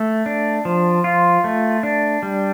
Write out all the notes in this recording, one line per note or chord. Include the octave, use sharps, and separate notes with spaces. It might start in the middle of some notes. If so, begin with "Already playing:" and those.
Already playing: A3
D4
F3
F4
A3
D4
G3